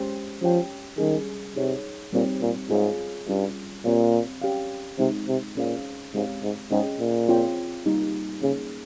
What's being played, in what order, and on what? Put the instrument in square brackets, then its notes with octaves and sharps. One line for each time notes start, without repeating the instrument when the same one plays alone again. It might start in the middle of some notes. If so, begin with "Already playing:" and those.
Already playing: [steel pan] G#3 C#4 G4 C5
[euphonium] F3 [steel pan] C#4 G4 C#5 G5
[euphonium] D#3 [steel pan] G3 C#4 G#4
[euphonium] C3 [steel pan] D#4 G#4 C#5
[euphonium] A#2 [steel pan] G3 C4 D#4 G4 C#5
[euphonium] A#2
[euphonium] G#2 [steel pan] F4 G#4 C#5 F5
[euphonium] G2 [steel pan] G3 C#4 F4
[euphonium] A#2 [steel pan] C4 G4 C#5 F5
[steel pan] C#4 G4 C#5 F5
[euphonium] C3 [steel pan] G#3 C4 D#4
[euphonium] C3
[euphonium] A#2 [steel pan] C#4 G#4 C5 F5
[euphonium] G#2 [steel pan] G#3 C4 G4 C#5 F5
[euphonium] G#2
[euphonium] G#2 [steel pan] C#4 G#4 D#5 G5
[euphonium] A#2
[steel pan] C4 F4 G#4 C#5 G5
G3 A#3 D#4 G4
[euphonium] C#3 [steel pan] A#3 C#4 G#4